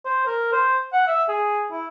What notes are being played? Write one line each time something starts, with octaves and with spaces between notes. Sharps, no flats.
C5
A#4
C5
F#5
E5
G#4
E4